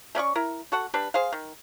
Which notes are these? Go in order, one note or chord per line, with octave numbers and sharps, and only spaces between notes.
A3 C#4 D5 C#6
E4 A#4
F#4 A4 F#5
G3 D4 B4
G#4 C5 F5
D#3